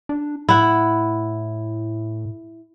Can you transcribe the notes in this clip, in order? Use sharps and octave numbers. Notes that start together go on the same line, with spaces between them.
D4
A2 E4 F#5